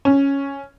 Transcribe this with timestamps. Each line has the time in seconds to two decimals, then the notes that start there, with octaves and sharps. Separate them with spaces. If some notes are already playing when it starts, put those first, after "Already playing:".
0.05 C#4